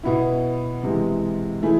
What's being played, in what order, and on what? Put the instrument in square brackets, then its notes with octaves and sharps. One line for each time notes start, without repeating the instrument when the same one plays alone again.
[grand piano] B2 B3 E4
C3 E3 G#3
E3 A3 E4 G#4